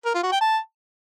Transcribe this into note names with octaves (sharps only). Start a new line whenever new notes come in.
A#4
F4
F#4
G5
A5